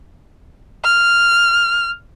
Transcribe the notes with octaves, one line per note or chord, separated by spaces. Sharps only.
F6